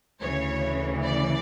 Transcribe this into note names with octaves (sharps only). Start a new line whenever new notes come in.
D2 C#3 E3 C#5
D5